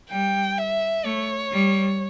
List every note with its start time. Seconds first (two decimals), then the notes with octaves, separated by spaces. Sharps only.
0.10 G3 G5
0.57 E5
1.05 A3 C#5
1.52 G3